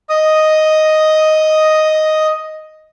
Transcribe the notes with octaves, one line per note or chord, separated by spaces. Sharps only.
D#5 D#6